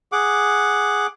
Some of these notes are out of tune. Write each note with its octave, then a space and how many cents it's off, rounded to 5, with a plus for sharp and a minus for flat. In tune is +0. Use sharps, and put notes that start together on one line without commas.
G#4 +0 F#5 +0 D6 +5